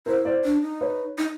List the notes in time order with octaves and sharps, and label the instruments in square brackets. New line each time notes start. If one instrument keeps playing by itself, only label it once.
[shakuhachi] E4 [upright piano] A#4 C5
[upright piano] C5 D5
[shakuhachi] D4
D#4
[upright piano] B4 C#5
[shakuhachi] D#4